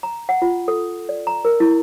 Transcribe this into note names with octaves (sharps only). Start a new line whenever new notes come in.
A#5
F#5
F4
A4
D5
A#5
A#4
E4